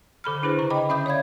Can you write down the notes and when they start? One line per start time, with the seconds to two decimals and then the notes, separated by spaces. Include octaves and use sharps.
0.24 D3 A4 B5 F6
0.43 D4 E4 G#4 B4 C5
0.59 C#3 A#5
0.70 D#5 G5 B5 D6
0.89 D3 C#4 E5 B5 D#6 G6
1.06 C#5 D5 F5 G#6